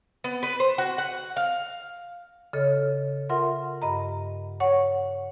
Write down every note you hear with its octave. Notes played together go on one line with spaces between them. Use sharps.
B3
B4
C5
F#4
F#5
F5
C#3 A4 C#5 D#5 F6
F4 A#4 E5 F#5 C6
G2 D#5 A#5
C#5 F#5 C#6